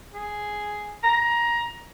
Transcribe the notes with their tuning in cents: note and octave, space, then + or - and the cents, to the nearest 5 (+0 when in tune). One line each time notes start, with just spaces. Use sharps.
G#4 +0
A#5 +20